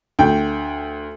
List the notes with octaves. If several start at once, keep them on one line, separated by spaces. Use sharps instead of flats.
D2 G5